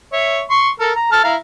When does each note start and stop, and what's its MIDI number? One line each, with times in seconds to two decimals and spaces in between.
0.13 0.41 73
0.13 0.41 76
0.50 0.69 84
0.50 0.69 85
0.80 0.91 69
0.80 0.91 70
0.96 1.09 82
1.12 1.22 69
1.12 1.22 81
1.12 1.22 89
1.24 1.36 64
1.24 1.36 77
1.24 1.36 82